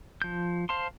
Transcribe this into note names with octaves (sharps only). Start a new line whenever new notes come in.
F3 G6
C5 F5 A5 C6